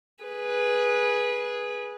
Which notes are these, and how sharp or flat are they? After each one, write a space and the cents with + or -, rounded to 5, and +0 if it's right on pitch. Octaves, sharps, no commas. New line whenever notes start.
G#4 +0 B4 -15